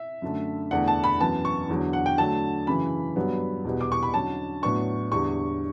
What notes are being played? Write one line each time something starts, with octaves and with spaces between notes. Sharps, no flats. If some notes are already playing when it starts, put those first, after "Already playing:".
Already playing: E5
F#2 D3 A3
E2 D3 A3 D4 F#5
A5
B5
F#2 E3 B3 A5
C#6
E2 D3 F#3
F#5
G5
D3 F#3 A3 D4 A5
F#2 C#3 E3 B5
G2 F#3 B3 D4
E2 B2 G3 B3
D6
C#6
B5
D3 F#3 C#4 A5
A2 F#3 B3 D4 C#6
E2 D3 G3 C#6